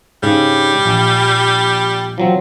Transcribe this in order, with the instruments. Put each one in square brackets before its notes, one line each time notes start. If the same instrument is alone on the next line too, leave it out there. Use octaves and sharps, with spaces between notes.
[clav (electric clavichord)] G#2 C#3 D4 [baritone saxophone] G3
[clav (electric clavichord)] A#1
F3 F#3 C4